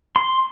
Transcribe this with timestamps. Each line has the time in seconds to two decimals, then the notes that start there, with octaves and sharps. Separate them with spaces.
0.16 C6